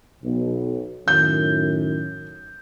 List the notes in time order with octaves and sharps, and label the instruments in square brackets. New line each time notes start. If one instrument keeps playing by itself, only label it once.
[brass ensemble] B1
[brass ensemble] F#2 A2 D#3 [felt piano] G6